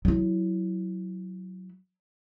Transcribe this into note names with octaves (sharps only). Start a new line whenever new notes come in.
F#3 E4